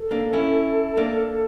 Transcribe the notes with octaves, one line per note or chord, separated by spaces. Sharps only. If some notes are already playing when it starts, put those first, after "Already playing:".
Already playing: A4
A#3 D4
C#4 E4
A#3 D4